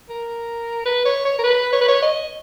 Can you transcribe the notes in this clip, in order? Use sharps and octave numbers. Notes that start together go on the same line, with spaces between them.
A#4
B4
C#5
C#5
A#4
B4
C#5
B4
C#5
D#5